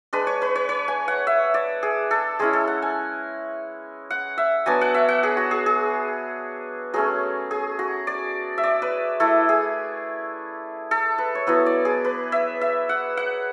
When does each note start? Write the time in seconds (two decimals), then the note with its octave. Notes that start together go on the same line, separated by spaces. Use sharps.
0.13 G#3 D4 B4
0.27 C#5
0.42 B4
0.56 C#5
0.69 C#5
0.88 G#5
1.08 F#5
1.27 E5
1.54 D5
1.83 G#4
2.11 A4
2.39 G#3 C#4 E4 G#4
2.53 A4
2.68 F#5
2.82 G#5
4.10 F#5
4.38 E5
4.66 F#3 B3 D4 G#5
4.81 F#5
4.94 E5
5.09 F#5
5.23 G#4
5.37 F#4
5.51 G#4
5.66 G#4
6.94 F#3 A3 C#4 G#4
7.51 G#4
7.79 F#4
8.07 D5
8.58 E5
8.63 D5
8.82 B4
9.20 A3 E4 A4
9.49 G#4
10.91 A4
11.18 B4
11.35 C#5
11.47 F#3 B3 E4 B4
11.66 D5
11.85 G#4
12.05 B4
12.32 E5
12.61 E5
12.89 F#5
13.17 F#5